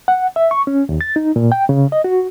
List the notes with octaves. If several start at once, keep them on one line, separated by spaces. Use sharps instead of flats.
F#5
E5
C#6
C#4
D#2
A6
D#4
A#2
G5
C#3
D#5
F#4